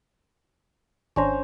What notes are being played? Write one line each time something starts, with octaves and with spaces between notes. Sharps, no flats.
G#1 C#4 D4 C5 A#5